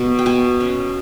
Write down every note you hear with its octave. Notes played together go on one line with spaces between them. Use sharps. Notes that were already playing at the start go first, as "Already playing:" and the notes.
Already playing: B2
G5
B2 G#5
C#4